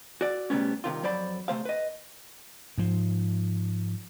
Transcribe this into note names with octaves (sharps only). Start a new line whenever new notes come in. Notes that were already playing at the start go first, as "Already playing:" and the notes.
F#4 D5
C3 G3 A3 B3 C#4
C2 C3 D#3 F4
F2 F#3 C5 D5 B5
C3 A3 C5 F5
B4 D#5
G#2 F3